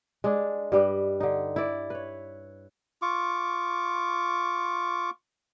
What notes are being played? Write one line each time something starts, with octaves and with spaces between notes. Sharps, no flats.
G#3 D4
G2 G3 B4 D#5
D3 D#4
E4 D5
B4 C#5
F4 C#6 D6